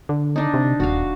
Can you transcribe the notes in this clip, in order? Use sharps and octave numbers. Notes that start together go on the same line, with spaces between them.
D3
D4 D#4
C3
D#1 F#4 F5